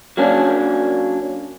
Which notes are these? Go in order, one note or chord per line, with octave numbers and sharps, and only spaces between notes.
F#3 A#3 C#4 D4